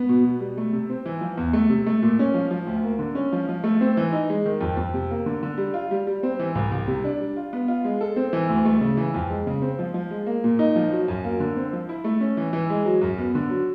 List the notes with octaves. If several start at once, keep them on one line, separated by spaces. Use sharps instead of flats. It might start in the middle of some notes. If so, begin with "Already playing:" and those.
Already playing: B3
B2
B2
G3
A3
C3
C4
E3
F3
E2
A3
C3
A3
A#2
C#4
F3
F3
D2
A#3
D3
C#4
F3
F3
A3
C4
E3
D#4
G#3
D#3
F2
F2
C3
A#3
D3
D3
G3
F4
G3
G3
C4
E3
C2
C2
C3
D4
G3
F4
B3
F4
G#3
A4
C4
E3
D2
A3
C#3
E3
F2
G#3
C#3
C4
F3
F3
G#3
A#3
A#2
D#4
F3
F#3
F#2
A#3
D3
C4
F3
E4
A3
C#4
E3
E3
G#3
F#3
F#2
B3
D3
F#3